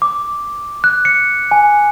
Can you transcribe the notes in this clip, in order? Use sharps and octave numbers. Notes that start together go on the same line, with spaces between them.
D6
F#6
C#7
G#5